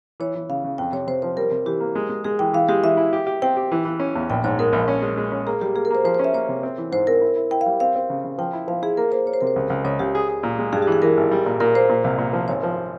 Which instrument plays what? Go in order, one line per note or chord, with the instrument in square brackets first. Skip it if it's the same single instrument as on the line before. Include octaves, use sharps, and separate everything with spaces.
[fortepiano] E3 [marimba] C#5
[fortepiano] E3
[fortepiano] C#3 [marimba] F5
[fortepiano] C#3
[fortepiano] F2 [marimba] G5
[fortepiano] C3 [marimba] C#5
[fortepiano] C3 [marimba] C5
[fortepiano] F3 [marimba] C5
[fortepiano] G3 [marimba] A#4
[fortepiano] C3
[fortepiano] E3 [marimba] G4
[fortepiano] A#3
G#3
G#3
[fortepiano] G#3 [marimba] G#4
[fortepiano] E3 [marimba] G5
[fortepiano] E3 [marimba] F5
[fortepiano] G#3 [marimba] G4
[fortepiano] E3 [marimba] E5
[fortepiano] E4
G4
G4
[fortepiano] C4 [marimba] G5
[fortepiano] G4
E3
E3
C#4
E2
[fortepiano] A#1 [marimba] G5
[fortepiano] G#2 [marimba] C#5
[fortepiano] G#3 [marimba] A#4
[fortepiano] A#1
C#4
G#3
G#3
C#4
[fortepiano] A#3 [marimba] G#4
[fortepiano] G3 [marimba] G4
[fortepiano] A#3 [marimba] G#4
[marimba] A#4
[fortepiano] A#3 [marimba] C5
[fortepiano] F3 [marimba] C5
[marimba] C5
[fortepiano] C#4
[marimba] E5
[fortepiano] A#3 [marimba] C#5
[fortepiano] C3
C4
E3
[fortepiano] G#2 [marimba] C5
[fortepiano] C4 [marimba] A#4
[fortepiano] E4
E4
[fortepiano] E4 [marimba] G5
[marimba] F5
[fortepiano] G3
[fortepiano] C4 [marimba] F5
[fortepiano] C4
C#3
C#3
[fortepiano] F3 [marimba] G5
[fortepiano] E4
[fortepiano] F3 [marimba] F5
[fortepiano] E4 [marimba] G#4
[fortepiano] A#3 [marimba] A#4
[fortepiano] A#3 [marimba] C5
[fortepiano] A#3 [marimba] C#5
[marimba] C5
[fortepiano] C3 [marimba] A#4
[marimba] C5
[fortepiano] C#2
C#2
[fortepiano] C#2 [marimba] C#5
[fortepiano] C#2 [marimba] G4
[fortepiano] G#4
G#4
A#2
G#3
[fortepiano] G2 [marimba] G#4
[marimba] G4
[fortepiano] E3
[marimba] G#4
[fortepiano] E3 [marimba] A#4
[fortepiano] G#1
G3
A#2
[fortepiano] A#2 [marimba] A#4
[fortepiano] A#3 [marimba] C5
[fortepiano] A#2
C2
A#2
F3
[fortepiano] G#1 [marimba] C#5
[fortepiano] F3